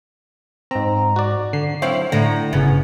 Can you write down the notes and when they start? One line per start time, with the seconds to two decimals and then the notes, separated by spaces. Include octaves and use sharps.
0.71 G#2 C4 A#5
1.16 F#4 D5
1.53 D3 C7
1.82 F#3 C4 E4 C5 C#5 F5
2.12 A2 D3 A#5 A#6
2.53 G1 C#3 B3 C#4